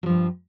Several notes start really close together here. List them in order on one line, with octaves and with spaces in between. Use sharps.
F#3 F3 G2